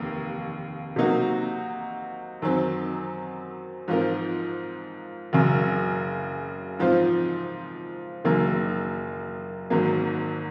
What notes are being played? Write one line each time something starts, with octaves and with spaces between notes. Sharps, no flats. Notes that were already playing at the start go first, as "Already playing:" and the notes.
Already playing: F1 D#2 A#3
C3 F#3 A#3 D#4 F#4
F#2 D#3 F#3 C4
G#2 F3 C4 F4 A#4
F#1 F#2 C#3
G#2 F3 C4 F4 C5
F#1 F#2 D#3 A#3
G#1 G#2 F#3 A#3